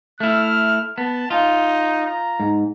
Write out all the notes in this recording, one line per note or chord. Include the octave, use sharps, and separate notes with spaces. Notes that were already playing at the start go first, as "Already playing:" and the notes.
A3 E4 F6
B3 A5
D#4 F4
A#5
G#2